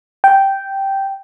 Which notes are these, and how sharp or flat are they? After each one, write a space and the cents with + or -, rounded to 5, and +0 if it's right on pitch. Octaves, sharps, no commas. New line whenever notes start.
G5 -5